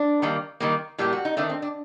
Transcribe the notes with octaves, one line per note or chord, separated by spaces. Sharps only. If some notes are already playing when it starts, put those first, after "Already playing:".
Already playing: D4
D#3 G3 A#3
D#3 G3 A#3
A2 G3 A#3 G4
F#4
D#4
D#3 A3 C4 D4
C4
D4